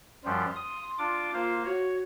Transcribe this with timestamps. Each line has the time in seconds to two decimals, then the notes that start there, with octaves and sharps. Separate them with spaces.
0.24 F#2 F3 G3 C6
0.56 D#6
0.98 D4 F4 D6
1.33 A#3 F4 C5 F5
1.65 F#4 C#5